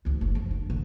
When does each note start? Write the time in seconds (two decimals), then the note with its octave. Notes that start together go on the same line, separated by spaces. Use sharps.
0.05 D2 G#2
0.21 F#1 C#3
0.35 F2
0.51 D4
0.70 D3